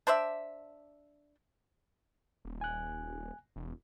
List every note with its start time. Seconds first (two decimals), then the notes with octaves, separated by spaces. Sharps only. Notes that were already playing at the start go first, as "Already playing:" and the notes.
0.07 D4 C5 D5 E5
2.45 D#1
2.61 G#5 F#6
3.56 E1